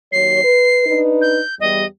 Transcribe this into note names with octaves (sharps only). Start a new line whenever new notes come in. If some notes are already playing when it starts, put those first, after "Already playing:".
D#2 F#3 C#5 C7
B4
D4 D#4 B4
G6
E2 G3 D#5